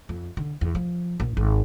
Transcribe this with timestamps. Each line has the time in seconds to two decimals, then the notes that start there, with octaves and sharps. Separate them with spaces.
0.09 F2
0.37 D3
0.61 E2
0.75 F3
1.20 A#1
1.37 G#1